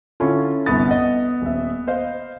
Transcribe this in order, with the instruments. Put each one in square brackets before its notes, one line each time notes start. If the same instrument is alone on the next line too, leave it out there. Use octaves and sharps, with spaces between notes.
[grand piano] D3 F4 [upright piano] C#4 E4 A4
[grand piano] G1 C2 A6 [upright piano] B3 D#6
[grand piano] D#5 F#5
D#1 E5
C5 D#5 F5